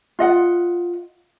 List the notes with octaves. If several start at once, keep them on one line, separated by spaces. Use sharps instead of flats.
F4 D#5 F#5